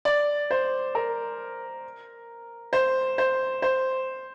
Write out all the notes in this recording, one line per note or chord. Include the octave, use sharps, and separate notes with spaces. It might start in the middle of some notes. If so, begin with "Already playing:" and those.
D5
C5
A#4
C5
C5
C5